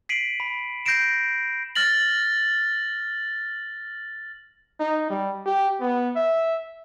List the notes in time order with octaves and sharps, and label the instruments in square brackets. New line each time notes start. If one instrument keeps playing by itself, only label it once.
[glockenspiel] B6 C7 D7 D#7 F#7
B5
G6 A#6 C7 D7 E7
[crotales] F6 A6 A#6 F#7
[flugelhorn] D#4
G3
G4
B3
E5